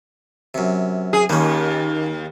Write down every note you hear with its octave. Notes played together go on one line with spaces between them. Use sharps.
F#2 C3
G#4
D#2 A#3 C#4